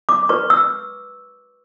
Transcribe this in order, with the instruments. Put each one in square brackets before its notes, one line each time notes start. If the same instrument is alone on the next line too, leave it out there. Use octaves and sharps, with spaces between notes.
[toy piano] D6
B4 C#6
E6